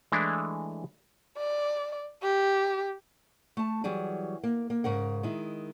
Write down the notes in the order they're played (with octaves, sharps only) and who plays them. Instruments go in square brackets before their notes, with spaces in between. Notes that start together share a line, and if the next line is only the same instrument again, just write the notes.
[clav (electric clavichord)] E3 G#3 A3 D4 E4
[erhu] D5
G4
[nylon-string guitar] A3 A5
E3 F#3 G3 G#4
A#3
A#3
G#2 C#3 A#4 F#5
D#3 G#3 E4